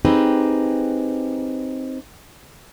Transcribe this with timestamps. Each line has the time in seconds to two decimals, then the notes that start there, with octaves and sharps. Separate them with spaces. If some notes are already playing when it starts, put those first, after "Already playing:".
0.05 C4 D#4 G4 G#4 B4